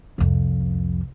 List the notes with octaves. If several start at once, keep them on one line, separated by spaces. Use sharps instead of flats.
C2 F2